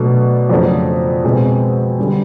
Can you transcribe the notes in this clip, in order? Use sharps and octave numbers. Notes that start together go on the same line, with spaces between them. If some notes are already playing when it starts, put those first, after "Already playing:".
Already playing: B2 F#3 A3 D4
F2 C#3 F#3 A3 D4
B2 G#3 C4
D3 G3